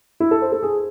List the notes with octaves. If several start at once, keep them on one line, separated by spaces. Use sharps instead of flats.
E4
A4
C5
A4
G#4